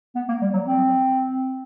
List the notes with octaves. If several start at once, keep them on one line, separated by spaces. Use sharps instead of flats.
B3
A#3
G3
F#3
C4